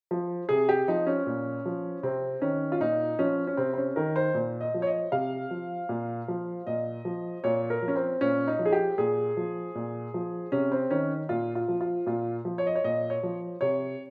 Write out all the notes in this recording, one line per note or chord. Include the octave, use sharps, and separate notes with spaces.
F3
C3 G#4
G4
F3 D#4
C#4
A#2
F3
C3 C4
D#3 C#4
F4
A#2 D#4
F3 C#4
C#4
C3 C4
C4
C#4
D#3 A#4
C5
A#2
D#5
F3
C#5
D#5
C3 F5
F3
A#2
F3
A#2 D#5
F3
A#2 C#5
A#4
F3
C#4
C4
A#2 C#4
D#4
F3
G#4
G4
A#2 G#4
F3
A#2
F3
C3 C#4
C4
D#3 C#4
A#2 F4
F4
F3
F4
A#2 F4
F3
C#5
D#5
C#5
A#2 D#5
C#5
F3
C3 C#5